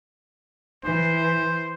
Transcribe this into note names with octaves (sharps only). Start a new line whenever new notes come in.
E3 C5